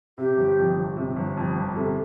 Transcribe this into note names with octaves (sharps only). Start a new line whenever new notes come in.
C3 G4
G1
F2
G1
C3
G1
F2
G1
C3 A4